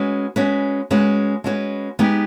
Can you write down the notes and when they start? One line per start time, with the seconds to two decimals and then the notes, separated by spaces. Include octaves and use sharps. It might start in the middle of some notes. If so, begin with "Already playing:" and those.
Already playing: G#3 C#4 F#4 B4
0.36 G#3 C#4 F#4 B4
0.91 G#3 C#4 F#4 B4
1.44 G#3 C#4 F#4 B4
1.99 G#3 B3 D#4 G4 B4